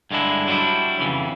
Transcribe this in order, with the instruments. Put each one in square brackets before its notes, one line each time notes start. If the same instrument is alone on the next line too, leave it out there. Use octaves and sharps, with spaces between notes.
[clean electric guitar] G2 D3 G#3 D4 E4
F#3 G3 B3 D4 E4
F2 C#3 E3